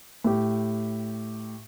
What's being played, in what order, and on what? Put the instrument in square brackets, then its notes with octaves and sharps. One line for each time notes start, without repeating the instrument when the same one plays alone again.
[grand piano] A2 G4